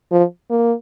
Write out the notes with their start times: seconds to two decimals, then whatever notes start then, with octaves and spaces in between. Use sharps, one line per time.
0.12 F3
0.50 A#3